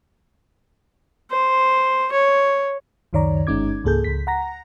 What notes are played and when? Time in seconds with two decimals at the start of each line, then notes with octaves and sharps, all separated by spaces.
1.31 C5
2.12 C#5
3.13 C#2 F#2 D#3 C#5 D5 A#5
3.47 G1 G#3 C#4 D#4 D6 G#6
3.84 C#2 G#2 A#3 G#4 A4 G6
4.04 C#2 B6
4.27 F#5 A#5 A#6